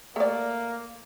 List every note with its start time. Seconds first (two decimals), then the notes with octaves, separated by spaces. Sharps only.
0.16 A3 A#3 D5